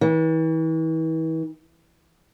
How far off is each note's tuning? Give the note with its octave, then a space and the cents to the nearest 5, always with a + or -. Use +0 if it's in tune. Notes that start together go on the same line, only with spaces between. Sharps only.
E3 -40